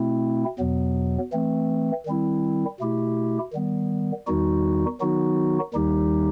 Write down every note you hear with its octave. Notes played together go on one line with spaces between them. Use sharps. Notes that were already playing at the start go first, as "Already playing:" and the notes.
Already playing: B2 A3 C4 E4
E2 B2 F#3 B3
E3 A3 C4
D#3 G3 C4 E4
B2 A3 E4 G4
D#3 G3 B3
E2 D#3 G3 D#4 F#4
D#3 F#3 B3 D#4 F#4
D#2 D#3 G3 D#4 G4